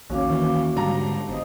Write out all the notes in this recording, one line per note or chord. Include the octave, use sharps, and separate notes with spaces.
A#1 D#2 C#4 F#4 F5 D6
D#3 E3
G#2 D3 G3 A5 A#5
G1 C5 D#5 D#6